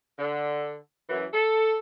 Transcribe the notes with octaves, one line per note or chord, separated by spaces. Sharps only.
D3
F#2 E3
A4